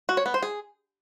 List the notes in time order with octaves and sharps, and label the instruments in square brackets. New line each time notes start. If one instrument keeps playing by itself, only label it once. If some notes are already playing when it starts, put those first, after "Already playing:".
[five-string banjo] F#4
C#5
B3
C5
G#4